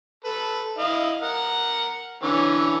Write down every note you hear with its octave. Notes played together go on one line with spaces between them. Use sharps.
A4 B4
E4 D#5 F5
A#4 F#5
D3 E3 C#4